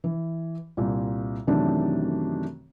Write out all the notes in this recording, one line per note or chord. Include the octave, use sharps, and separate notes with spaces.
E3
C2 A#2
F#2 C3 D#3 E3 A3 D4